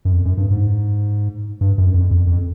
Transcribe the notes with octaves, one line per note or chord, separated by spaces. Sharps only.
F#2
F2
F#2
G2
G#2
G2
F#2
F2
F2
F2